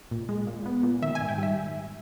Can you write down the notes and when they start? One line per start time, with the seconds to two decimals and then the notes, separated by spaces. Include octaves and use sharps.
0.11 A#2
0.29 G#3
0.47 A#2
0.66 B3
0.83 A#2
1.02 D#3 E5
1.15 G#5
1.21 G#2
1.29 G5
1.38 G3 E5